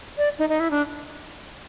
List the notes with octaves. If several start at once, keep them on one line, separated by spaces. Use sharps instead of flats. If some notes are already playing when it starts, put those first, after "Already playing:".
D5
D#4
D#4
E4
D4